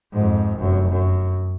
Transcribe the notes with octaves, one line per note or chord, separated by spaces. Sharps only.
F2 G#2
F1 F#2
F#2